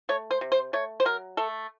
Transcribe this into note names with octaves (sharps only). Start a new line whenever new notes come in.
A3 C#5
C5
C3
C5
A3 C#5
C5
F#3 A#4
A3 A4